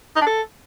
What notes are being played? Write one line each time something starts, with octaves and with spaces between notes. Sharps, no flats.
D#4
D4
A4